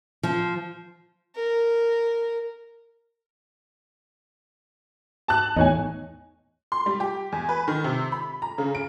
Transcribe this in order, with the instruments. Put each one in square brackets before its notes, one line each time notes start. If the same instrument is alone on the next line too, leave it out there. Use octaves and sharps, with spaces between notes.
[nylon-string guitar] F3
[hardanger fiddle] A#4
[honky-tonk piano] A5 F#6
[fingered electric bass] E2 A2 [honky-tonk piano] D#4 C#5 G#5
[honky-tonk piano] C6
G3
G4
E2
B4
D#3
C3
B5
A#5
C#3
D7